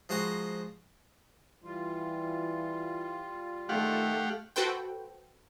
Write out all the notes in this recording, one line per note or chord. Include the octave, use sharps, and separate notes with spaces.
F3 G#3 F#4 C5 A#5
E3 G3 F4
D#3 A3 G4 F5 F#5
F#4 A4 B4 C5 G5